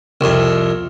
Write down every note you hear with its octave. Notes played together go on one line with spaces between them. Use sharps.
C2 F2